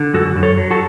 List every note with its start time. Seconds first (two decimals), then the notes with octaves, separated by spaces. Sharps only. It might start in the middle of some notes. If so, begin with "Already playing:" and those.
Already playing: D3
0.14 F#2 F#4 A4
0.36 F#2
0.43 A4 C#5
0.58 F#3
0.71 F#4 A4